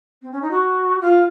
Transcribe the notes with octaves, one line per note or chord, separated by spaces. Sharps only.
C4
C#4
D#4
F#4
F4